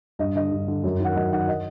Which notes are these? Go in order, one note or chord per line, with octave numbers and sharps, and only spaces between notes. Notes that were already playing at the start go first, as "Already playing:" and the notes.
G2 D#5
D3 D#5
G2
D3
F#2
D#3 F#5
F#2 D#5
D#3 F#5
D#5